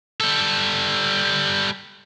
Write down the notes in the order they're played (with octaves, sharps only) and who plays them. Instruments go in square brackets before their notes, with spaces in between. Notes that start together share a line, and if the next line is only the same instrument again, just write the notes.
[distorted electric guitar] G3 A4